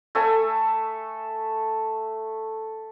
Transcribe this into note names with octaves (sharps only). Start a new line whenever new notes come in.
A3 A4 E5 G#5